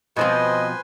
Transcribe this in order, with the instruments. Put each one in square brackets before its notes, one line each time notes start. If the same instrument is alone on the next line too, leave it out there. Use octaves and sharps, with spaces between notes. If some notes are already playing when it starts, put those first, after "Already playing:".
[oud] B2 F3 C4 [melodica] B4 C5 G#5 [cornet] D#5